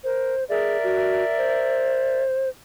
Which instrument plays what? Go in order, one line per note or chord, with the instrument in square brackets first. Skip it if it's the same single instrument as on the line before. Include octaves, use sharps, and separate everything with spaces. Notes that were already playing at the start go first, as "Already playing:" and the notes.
[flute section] A#4 [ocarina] C5
[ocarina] G#4 [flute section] A#4 D5 E5
[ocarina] F#4
C5